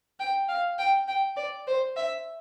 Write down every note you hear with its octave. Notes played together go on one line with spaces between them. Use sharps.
G5
F5
G5
G5
D5
C5
E5